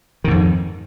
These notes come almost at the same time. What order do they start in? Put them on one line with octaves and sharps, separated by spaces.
D#3 G#2 F2